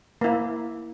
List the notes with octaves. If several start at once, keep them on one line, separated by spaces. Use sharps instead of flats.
A#3 E4